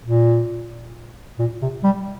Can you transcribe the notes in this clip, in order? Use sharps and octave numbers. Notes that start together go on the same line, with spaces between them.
A#2
A#2
C3
G3